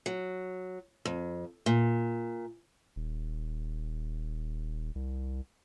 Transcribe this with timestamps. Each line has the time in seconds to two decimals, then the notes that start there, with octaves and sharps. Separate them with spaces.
0.06 F#3
1.05 F2
1.66 A#2
2.96 D#1
4.95 C2